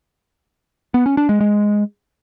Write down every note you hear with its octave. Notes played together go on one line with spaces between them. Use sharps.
B3
C#4
D4
G#3
G#3